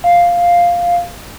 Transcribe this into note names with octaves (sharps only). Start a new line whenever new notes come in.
F5